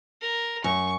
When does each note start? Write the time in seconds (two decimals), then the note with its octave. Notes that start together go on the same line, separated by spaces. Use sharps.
0.21 A#4
0.64 F#2 C#6